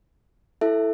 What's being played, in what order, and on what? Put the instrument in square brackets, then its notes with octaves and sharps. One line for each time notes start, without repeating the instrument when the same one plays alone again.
[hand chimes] E4 A4 E5